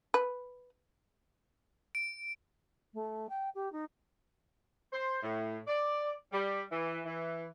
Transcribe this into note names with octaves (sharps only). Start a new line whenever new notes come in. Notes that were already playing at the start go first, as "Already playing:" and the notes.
B4
D7
A3
G5
G4
D#4
C5
A2
D5
G3
E3
E3